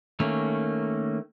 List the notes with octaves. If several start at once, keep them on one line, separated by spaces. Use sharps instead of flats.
D#3 A3 A#3 C#4